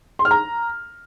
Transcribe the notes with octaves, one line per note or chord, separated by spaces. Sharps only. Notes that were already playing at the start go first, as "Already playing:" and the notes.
C6
F6
A#5